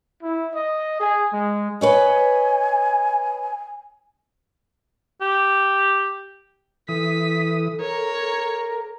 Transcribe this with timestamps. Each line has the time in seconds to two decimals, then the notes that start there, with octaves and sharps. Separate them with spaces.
0.22 E4
0.54 D#5
0.99 G#4
1.32 G#3
1.81 B4 C#5 D#5 G#5
5.21 G4
6.89 E3 A4 D#6 B6
7.80 A#4 C#5 A#5